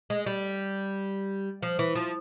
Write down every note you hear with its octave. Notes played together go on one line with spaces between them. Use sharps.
G#3
G3
F3
E3
F3